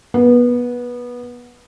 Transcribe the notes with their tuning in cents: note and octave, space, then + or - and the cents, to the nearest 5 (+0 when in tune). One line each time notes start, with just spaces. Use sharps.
B3 -20